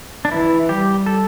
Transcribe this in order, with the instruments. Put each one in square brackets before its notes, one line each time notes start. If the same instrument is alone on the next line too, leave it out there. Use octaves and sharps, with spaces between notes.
[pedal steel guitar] D4
[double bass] E3 [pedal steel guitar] E4
[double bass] G3 [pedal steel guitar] G4
[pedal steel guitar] A4